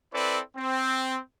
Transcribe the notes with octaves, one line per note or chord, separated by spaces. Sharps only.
C4 E4 A4 B4 D5
C4